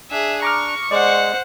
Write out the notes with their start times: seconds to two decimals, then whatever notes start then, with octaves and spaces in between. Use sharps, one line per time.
0.11 D4 G#4 E5
0.42 A#5 C#6 D6 F6
0.91 G#3 C5 D5 F#5